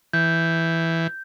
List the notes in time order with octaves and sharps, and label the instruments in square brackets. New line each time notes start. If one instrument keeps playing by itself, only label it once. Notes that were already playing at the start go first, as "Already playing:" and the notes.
[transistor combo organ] E3 [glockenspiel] G6